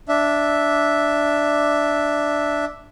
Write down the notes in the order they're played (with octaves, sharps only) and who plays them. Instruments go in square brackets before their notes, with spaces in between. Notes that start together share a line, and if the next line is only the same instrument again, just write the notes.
[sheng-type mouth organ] D4 E5